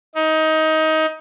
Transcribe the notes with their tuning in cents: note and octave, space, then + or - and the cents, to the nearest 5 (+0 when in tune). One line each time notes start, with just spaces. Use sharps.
D#4 +20